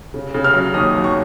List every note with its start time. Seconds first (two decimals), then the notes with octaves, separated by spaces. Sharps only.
0.14 C#3
0.34 C#3
0.44 F6
0.54 F#3
0.74 D#2 D#6
0.94 F#3
1.04 C#6